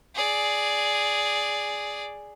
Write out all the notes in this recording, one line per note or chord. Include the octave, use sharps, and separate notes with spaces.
G#4 D5